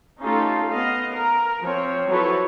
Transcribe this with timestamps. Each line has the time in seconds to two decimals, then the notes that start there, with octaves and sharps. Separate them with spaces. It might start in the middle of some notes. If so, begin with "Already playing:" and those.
0.22 A3 C#4 D#4 F4 G4 A4
0.71 B3 D#5 F5
1.16 A#4
1.62 F3 C4 C#5
2.09 F3 F#3 E4 A4 B4 C#5